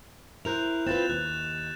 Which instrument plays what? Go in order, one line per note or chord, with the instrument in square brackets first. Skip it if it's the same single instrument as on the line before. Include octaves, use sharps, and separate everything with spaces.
[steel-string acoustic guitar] E4 A#4 C5 [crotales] F#6 G6 F7
[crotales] F#7
[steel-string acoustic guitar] C4 F4 B4 [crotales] A6 E7
[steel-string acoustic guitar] D#2 [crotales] F#6 G6